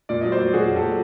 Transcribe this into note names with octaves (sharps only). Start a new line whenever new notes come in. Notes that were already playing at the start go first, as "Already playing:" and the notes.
A#2 D5
F#3 D#5
C5 D5
F#3
A#2 F#4 G#4
A#2
G4 A4
F#3